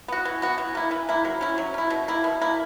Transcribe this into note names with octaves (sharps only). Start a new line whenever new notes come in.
B3 F#4
E3
B3 F#4
E3
A#3 E4
E3
A#3 E4
F#3
C#4 E4
F#3
C#4 E4
B2
A#3 E4
B2
A#3 E4